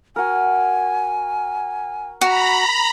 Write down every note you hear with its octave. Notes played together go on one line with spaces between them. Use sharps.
F#4 A#4 G#5
F#4 A#5 B5